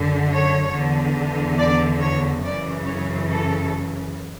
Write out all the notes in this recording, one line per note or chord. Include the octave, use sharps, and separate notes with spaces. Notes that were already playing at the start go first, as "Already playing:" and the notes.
Already playing: F#2 D3
C#5
E2 D3
D5
C#5
F#2 C#3 E3 D5
C#5
A4